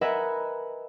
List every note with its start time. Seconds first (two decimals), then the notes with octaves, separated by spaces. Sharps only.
0.01 A#4 B4 D#5 E5 F#5 G#5